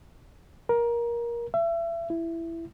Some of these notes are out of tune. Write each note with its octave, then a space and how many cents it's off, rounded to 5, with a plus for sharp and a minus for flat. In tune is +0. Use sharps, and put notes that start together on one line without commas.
A#4 +20
E5 +30
E4 +10